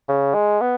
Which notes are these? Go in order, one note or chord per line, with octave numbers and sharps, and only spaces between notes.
C#3
G#3
B3